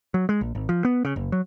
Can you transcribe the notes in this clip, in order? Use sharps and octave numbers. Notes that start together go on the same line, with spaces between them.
F#3
G#3
A#1
G#1
F3
B3
C#3
F#1
F#3